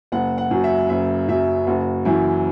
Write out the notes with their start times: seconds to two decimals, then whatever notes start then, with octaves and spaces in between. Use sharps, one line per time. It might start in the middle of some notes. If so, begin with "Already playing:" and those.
0.12 F#1 F#5
0.38 F#5
0.51 F#2 F#3
0.64 E5
0.89 F#1 E5
1.28 F#2 F#3 E5
1.67 F#1 F#4
2.05 F#2 E3 E4